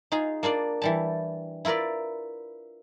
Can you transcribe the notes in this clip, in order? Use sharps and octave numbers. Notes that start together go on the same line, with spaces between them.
D#4 F4 G#4
A#3 D4 F4 D5
E3 G3 A5
E4 F4 A#4 B4 D5